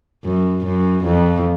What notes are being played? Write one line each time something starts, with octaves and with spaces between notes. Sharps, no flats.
F#2
F#2
F2